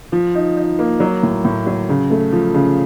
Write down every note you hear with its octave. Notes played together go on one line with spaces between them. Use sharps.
F3
D#4
D#4
A#3
F#3
A2
A2
F#3
C#3
A3
F3
C#3